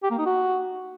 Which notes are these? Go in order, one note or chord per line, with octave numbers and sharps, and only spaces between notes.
G4
A#3
D#4
F#4